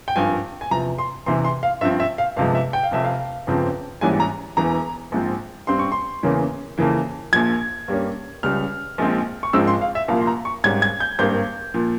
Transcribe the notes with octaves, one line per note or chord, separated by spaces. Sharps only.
G5
G#1 G2 F3 G#5
G#5
E2 C3 F3 A#5
C6
E2 C3 E3 C6
C6
F5
G2 F3 C4 E5
E5
F5
G1 F2 C3 F3 G#3 F5
E5
G5
F5
F1 F2 C3 E5
F5
G1 F2 C#3 F3 C4
A#1 G#2 E3 G3 C#4 G#5
A#5
E1 E2 E3 A#5
A#1 G#2 F3 C4
G2 G3 C4 C6
C#6
C6
E2 C#3 E3 A#3 C#4
F2 C#3 E3 A#3
A#1 A#2 F3 G#6
G2 G3 A#3 C#4
C#2 C#3 G3 F6
A#1 A#2 F3 G#3 C4
C#6
G#1 G#2 F3 G#3 C4 E6
C6
F5
E5
C2 A#2 F3 A#3 F5
C6
A#5
C#6
G#1 G#2 G3 C#4 G#6
G#6
G6
G#1 G2 G3 A#3 G6
A#2 F3